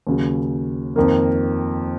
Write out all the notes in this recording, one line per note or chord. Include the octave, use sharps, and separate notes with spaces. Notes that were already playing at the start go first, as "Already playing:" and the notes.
D#2 C#3 F#3
F2 D#3 A#3